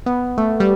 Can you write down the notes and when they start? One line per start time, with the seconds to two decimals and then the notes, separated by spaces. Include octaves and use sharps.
0.06 B3
0.38 A3
0.60 G3